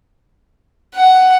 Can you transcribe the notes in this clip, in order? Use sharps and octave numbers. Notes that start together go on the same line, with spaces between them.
F#5